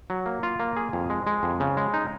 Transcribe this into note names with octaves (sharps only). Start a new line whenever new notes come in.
F#3
A#3
F4
A#3
G#4
F2
G#3
G#3
F2
C#3
G#3
D#4